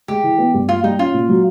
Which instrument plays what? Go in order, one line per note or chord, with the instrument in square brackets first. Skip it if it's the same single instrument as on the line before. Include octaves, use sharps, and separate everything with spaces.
[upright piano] G#3 [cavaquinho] G4
[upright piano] E3
B3
G2
[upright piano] A#3 [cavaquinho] F4
[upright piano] G3 [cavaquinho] D#4
[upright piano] C#4 [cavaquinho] F4
[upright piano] A#2
F#3